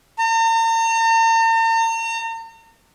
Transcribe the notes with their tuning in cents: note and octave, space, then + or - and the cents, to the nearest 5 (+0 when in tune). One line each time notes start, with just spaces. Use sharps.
A#5 -45